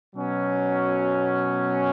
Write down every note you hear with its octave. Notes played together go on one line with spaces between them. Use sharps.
B2 F#3 C#4